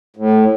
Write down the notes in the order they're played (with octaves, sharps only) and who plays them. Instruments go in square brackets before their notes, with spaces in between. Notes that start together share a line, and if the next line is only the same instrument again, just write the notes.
[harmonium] A2